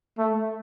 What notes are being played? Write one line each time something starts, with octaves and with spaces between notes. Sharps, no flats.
A3